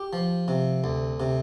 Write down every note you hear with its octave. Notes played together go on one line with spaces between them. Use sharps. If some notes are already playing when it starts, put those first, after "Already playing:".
Already playing: G4
F3
C3
D2
C3